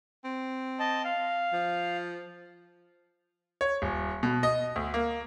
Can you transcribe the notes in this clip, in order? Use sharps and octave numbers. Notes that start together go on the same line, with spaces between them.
C4
D#5 A5
F5
F3
C#5
D#1
B2
D#5
D2
A#3